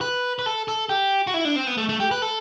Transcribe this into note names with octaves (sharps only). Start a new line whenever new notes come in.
B4
B4
A4
A4
G4
F#4
E4
D4
C4
B3
A3
A3
G4
B4
A4